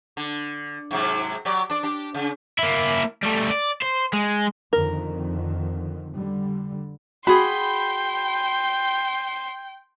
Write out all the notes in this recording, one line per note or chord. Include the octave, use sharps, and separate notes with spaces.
D3
G#2 C3 F#3
F#3 G4 D5
D4 D5
D4 G4
C#3
A#3 E4
G3 A3
D5
C5
G#3
F2 D3 D#3 A#4
D3 G3
F#4 G#4 G5 B5 C6